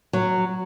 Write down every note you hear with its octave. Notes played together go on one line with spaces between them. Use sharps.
F#3